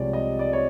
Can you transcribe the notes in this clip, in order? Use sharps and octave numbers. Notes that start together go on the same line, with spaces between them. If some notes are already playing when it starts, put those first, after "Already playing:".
Already playing: C2 C3 F3 G#3 C#5 D5
D#5
D5
C#5